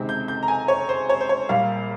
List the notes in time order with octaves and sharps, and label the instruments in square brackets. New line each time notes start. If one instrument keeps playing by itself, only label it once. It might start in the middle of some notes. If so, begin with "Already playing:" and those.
Already playing: [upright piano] C#2 C3 D#3 G#3 C4
G6
G6
A#5
G#5
C#5
C5
C#5
C5
C#5
A#1 A#2 G3 A#3 F5